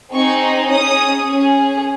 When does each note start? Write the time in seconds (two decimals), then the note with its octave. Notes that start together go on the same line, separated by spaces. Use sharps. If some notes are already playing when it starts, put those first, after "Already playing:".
0.13 C4 D#4 G#4 C#6
0.70 C#4 G#4 D#6
1.27 C#4 G#4